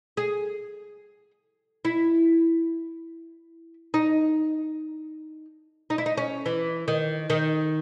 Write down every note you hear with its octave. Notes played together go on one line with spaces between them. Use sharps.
G#4
E4
D#4
D#4
E4
D#4
C#4
E3
D#3
D#3